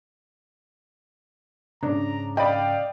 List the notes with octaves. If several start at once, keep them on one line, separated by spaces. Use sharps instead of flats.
G#2 C#3 D4 A#5
D5 D#5 F5 G5 B5